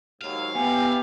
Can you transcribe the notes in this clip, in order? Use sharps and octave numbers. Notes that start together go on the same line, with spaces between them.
D#2 G#2 F#3 F5
B3 E4 G4 G#5